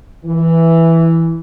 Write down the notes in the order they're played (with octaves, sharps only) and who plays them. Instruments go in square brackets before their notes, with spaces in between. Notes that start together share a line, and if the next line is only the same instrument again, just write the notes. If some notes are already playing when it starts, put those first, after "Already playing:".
[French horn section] E3